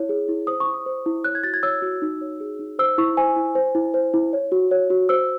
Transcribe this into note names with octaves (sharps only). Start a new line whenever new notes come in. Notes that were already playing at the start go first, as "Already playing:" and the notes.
Already playing: E4 C#5
G#4
E4
C5 D#6
C#6
E4
D#6
C5
E4
C#5 F#6
G#6
F#4 A6
G#6
C#5 E6
F#4
D#4
C#5
G#4
D#4
C5 E6
E4 C#6
C5 G#5
E4
C5
E4
C5
E4
C#5
F#4
C#5
F#4
C5 E6